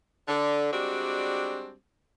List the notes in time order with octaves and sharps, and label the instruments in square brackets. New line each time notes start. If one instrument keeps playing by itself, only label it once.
[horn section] D3
G3 G#3 C4 D4 F#4